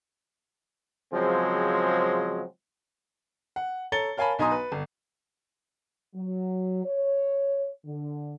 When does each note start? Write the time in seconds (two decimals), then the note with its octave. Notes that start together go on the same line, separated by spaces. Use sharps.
1.13 C#3 F3 F#3 G#3 C4
3.56 F#5
3.92 A4 C#5 A#5 A6 C#7 G7
4.17 A#4 C#5 F5 G#5 A5 B5
4.39 B1 D#4 G#5 A#5 C6 D#6
4.51 B4
4.72 G1
6.15 F#3
6.85 C#5
7.86 D3